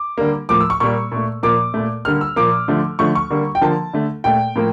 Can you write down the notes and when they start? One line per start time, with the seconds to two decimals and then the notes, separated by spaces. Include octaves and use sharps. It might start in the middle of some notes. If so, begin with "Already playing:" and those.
Already playing: D6
0.18 D3 G3 A#3
0.49 A2 F3 A#3 D6
0.60 E6
0.70 C#6
0.80 A#2 G3 A#3 C#6
1.12 A#2 A3
1.43 A#2 F3 A#3 D6
1.74 A#2 A3
2.05 D3 G3 A#3 F6
2.21 E6
2.36 A#2 F3 A#3 D6
2.68 D3 F3 A3
2.99 D3 F3 A3 C#6
3.15 C#6
3.30 D3 G3 A#3
3.55 G5
3.61 D3 F3 A#3 A5
3.93 D3 A3
4.24 A#2 A3 G5
4.56 A2 F3 A#3